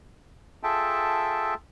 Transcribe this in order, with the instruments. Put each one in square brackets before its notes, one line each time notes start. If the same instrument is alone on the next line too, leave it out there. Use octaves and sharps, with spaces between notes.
[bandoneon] F4 G#4 A4 E5 G5 A5